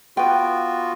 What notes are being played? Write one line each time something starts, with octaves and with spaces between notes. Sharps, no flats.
B3 F4 F#4 B4 G5